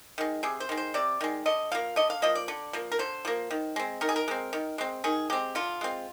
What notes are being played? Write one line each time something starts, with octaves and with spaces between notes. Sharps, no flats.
D#3 G#3
C3 G#4
C5
D#3 G#3
C5
C3 D5
D#3 G#3
D3 D#5
F3 A#3 F5
D3 D#5
F5
F3 A#3 D#5
D5
D3
F3 A#3
A#4
D3 C5
F3 A#3
D#3
G#3 C4
D#3 A#4
G#4
A#4
G#3 C4
D#3
G#3 C4
D#3 G#4
G#3 C4 G4
D3 F4
G#3 C4